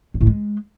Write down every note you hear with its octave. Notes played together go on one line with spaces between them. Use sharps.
G2
A2
G#3